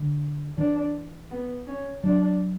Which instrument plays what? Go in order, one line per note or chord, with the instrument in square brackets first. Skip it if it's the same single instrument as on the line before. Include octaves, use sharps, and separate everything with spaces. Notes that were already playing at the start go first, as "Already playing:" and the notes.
Already playing: [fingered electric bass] D3
[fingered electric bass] E3 [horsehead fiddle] D4
[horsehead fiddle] B3
C#4
[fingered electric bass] F#3 [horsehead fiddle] D4